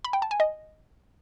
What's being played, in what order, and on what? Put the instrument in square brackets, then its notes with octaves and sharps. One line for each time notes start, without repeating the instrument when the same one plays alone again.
[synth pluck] B5
G5
A5
G#5
D#5